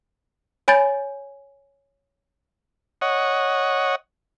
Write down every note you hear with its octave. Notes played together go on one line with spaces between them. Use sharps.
C#5 G#5 B5 G6 A6
C#5 D#5 F#5